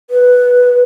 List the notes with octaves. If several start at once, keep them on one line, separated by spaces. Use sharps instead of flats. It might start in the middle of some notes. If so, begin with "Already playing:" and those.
B4